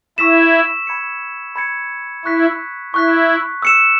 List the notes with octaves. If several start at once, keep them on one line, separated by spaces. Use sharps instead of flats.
E4 C#6 E6 B6 E7
B5 G#6 C#7
B5 G#6 C#7
E4 C#6 F#6 B6
E4 C#6 F#6 B6
E6 C#7 E7